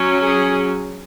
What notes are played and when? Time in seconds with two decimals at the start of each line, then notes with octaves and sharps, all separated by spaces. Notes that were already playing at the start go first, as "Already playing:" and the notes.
Already playing: F#3 C#4
0.22 G#4